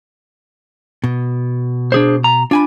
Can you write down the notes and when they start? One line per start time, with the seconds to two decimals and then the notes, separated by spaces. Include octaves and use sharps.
1.04 B2
1.92 D4 G#4 C5
2.24 A#5
2.51 D4 F4 G#5 B5